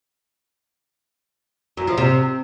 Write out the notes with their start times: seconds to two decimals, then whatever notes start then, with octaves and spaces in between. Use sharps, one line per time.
1.77 F#2
1.87 F3
1.98 C3